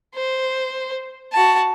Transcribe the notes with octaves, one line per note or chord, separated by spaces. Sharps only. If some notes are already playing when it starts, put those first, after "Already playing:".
C5
F#4 A5